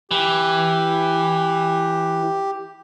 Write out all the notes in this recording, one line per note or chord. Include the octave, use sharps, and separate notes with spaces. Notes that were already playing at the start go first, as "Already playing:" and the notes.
E3 G4